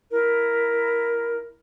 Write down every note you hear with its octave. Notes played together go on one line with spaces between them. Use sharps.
E4 A#4